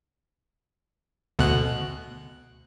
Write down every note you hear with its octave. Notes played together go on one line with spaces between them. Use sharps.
D2 B2 F#6